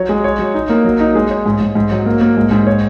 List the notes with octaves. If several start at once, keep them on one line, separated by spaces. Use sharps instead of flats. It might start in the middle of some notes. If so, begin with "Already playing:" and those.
Already playing: F#3 C#5
G#3
C#5
F#3
D#4
A#3
F#3
D#4
G#3
C#5
G#2
G#2
G#2
F#3
A#3
A#3
G#2
G#2
C#5